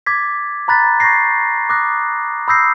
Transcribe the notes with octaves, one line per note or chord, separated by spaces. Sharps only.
D6 G#6 A6 B6
A#5 B5 F#6 A6 B6
C#6 G6 G#6 A#6 C7
D6 D#6 F#6 A#6
B5 D#6 E6 G6 A#6 C7